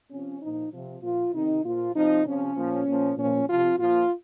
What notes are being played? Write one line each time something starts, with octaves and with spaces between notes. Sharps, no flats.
C3 F3 C#4
A#2 F3 D#4
C3 F3
A#2 F3 F4
C3 D#3 D#4
A#2 F3 F4
C3 F3 D#4
C3 F3 C#4
A#2 F3
A#2 F3
A#2 F3 C#4
C3 F3 F4
A#2 F3 F4